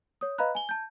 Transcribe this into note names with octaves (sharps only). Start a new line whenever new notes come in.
C#5 D#6
B4 D#5 F5 A#5 B5 F#6
G#5 G7
A5 G6